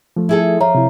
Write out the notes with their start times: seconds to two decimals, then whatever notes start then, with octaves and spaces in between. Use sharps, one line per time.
0.16 F3 A3
0.29 E4 G#4 A4
0.60 F3 C#5 E5 A#5
0.75 C3 E4